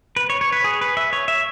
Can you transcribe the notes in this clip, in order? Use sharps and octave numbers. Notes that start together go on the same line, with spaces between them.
B4
C#5
C#5
B4
G#4
B4
E5
C#5
E5